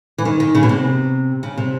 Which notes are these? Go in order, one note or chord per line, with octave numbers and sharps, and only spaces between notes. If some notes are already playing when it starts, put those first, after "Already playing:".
E3
D#3
D#3
C#3
B2
C3
C#3
C3